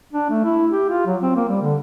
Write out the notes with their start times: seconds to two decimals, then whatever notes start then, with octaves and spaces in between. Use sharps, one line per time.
0.13 D4
0.30 A3
0.44 E4
0.71 G4
0.89 F4
1.06 F#3
1.22 C4
1.36 A#3
1.49 G3
1.62 D3